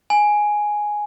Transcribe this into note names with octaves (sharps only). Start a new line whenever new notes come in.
G#5